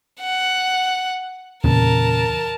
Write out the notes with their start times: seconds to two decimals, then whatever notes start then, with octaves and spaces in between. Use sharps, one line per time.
0.20 F#5
1.64 E2 A#2 C#3 A#4 A5